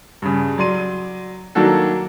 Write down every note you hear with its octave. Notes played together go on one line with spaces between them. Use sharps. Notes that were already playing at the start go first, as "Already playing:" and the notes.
G2 C#3
F#3 D5 C6 D#7
D#3 F#3 A#3 D4 F#4 A4